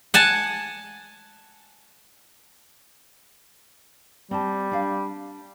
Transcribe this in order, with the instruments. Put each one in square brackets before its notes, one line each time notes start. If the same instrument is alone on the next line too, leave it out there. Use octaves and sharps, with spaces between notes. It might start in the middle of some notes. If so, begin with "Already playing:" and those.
[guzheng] F#5 G#5 A5
[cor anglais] G3 [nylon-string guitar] C4 A5
[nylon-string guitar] D4 F5